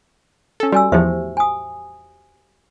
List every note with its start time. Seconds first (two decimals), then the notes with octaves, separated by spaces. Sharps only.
0.60 C#4 A4
0.72 G3 F#4 G#5 E6
0.92 E2 A2 F3 G4 C5 E5
1.37 G#5 D#6